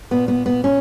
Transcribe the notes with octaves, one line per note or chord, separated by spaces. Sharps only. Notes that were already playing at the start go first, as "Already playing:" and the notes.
A#2 B3
B3
B3
C#4